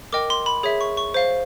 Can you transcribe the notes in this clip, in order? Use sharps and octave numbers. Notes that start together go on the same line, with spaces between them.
A#4 D#5 G5 D6
C6
B5
G#4 C#5 E5
C#6
C#6
C5 F5